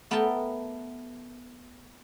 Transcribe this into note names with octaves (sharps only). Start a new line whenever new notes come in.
A3 B3 A#4 E5 G5 A5